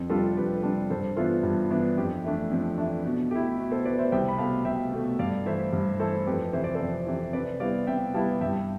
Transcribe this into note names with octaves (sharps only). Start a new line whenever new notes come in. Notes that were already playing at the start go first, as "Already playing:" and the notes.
Already playing: F2
C3 G3 D4 F4 A4
F2 G4 B4
C3 G3 D4
G2 A4 C5
E3 B3 D4 F4 A4
G2
E3 B3 D4
F2 G4
E3 A3 D4
F2
E3 A3 D4
B2
A3 E4 G4
B2
A4 C5
A3 E4 B4 D5
C5 E5
C2 E5 G5
B5
B2 A3 F5 A5
C2 E5 G5
B2 A3
G2 D5 F5
E3 A3 E4 C5 E5
G2
E3 A3 E4 A4 C5
F2 G4 B4
C3 E3 C5
D5
A4 C5
F2
C3 E3
C3 B4 D5
G3 B3 E4 D5 F5
C3 E5 G5
G3 B3 E4 F5 A5
G2 E5 G5